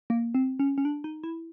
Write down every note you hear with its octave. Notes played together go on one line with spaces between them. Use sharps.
A#3
C4
C#4
C#4
D4
D#4
E4